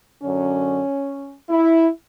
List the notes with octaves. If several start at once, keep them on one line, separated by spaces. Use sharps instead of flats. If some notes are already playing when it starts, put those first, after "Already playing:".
F#2 D3 F#3 C#4
E4